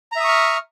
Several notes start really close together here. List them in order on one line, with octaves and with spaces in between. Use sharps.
A#5 E5 D#6 C#6 F6